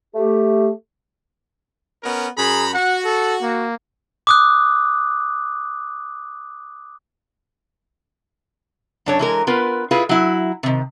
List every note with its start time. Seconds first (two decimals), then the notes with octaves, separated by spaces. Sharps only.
0.15 A3 G4
2.03 B3 C#4 A#4
2.38 F#2 G#4 A#5 B5
2.74 F#4 F#5
3.05 A4
3.42 A#3
4.27 D6 D#6 F#6
9.06 F#2 D4 C#5
9.19 E3 G#3 A#4
9.47 B3 F4 A#4 B4
9.91 E4 F4 G#4 B4
10.09 F#3 E4
10.63 C3 D#3